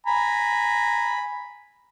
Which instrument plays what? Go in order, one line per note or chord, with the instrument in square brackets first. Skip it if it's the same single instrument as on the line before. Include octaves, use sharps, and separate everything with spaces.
[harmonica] G#5 A#5 B5